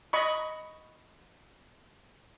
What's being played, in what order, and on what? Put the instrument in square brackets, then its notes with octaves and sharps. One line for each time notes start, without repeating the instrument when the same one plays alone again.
[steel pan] D#5 B5 C#6